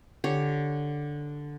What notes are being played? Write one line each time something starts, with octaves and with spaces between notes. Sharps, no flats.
D3 G4 C#5